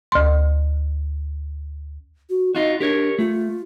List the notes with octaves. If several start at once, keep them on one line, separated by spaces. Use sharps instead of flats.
D2 C6
F#4
D#4 F4 F#4 D#5
D4 G4 A#4 C#5
A3 F4